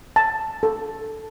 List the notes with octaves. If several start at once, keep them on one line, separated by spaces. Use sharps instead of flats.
A5
A4